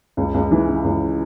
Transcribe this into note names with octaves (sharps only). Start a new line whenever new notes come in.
C#2
C#2
E3
C#3
C#2